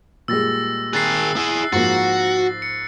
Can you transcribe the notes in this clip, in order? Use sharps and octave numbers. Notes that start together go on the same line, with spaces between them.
A#2 G3 G#3 E6 A6 A#6
D#3 G#4 F#6 A6 C7
E4 G#4
G#2 F3 A#3 F#4 A6
C#7